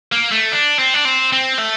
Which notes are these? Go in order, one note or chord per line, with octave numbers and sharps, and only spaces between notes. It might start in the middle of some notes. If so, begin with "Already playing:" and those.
A#3
A3
D4
C4
D4
C4
C4
A3